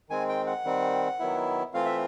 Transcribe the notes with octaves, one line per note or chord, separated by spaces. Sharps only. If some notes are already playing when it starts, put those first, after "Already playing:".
D#3 G#3 C4 G#5
G5
F#5
D#3 G3 C4
D#3 F#3 B3 E4
E3 A3 C4 F4 F5
E5